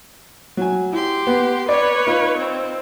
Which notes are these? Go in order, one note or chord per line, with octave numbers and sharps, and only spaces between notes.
F#3 G#5
E4 G4 C6
B3
B4 C#5 D5 D6
D#4 F4
C4